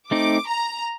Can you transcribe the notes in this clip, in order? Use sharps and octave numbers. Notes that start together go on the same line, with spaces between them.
A3 C4 D#4 D6
A#5